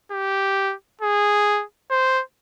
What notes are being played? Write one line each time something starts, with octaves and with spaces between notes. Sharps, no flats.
G4
G#4
C5